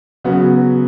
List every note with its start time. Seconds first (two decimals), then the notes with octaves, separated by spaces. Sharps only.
0.24 C#3 F#3 B3 F#4